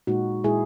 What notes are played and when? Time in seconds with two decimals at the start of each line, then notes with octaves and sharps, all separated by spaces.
0.07 A#2 G#3 D#4 F#4
0.44 A#2 G#3 E4 G#4